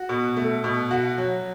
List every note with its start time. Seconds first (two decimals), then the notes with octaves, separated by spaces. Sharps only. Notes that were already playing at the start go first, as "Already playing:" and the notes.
Already playing: F#4
0.09 B2
0.37 A3
0.64 B2
0.91 F#4
1.18 F#3